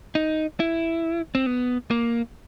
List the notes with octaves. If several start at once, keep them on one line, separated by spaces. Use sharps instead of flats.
D#4
E4
C4
B3
A#3